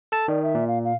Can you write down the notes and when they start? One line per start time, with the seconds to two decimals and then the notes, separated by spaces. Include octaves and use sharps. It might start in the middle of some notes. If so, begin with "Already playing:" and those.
0.12 A4 A5
0.28 D#3 D5
0.43 E5
0.55 A#2
0.68 F5
0.84 F5